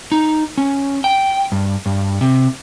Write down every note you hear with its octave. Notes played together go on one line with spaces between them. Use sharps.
D#4
C#4
G5
G2
G2
C3